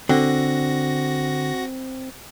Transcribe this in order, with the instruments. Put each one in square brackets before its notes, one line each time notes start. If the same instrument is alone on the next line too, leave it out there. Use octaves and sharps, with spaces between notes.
[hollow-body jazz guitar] D3 [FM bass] C4 [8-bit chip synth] F#4 A#6